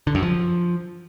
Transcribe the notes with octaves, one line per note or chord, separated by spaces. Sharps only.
D3
F#2
F3